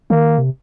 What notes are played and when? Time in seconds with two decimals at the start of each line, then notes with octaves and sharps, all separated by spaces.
0.10 D#3 A#3
0.38 C3